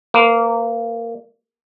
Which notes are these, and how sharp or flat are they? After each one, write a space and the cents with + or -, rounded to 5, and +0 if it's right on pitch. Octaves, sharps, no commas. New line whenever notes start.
A#3 -15 B4 +25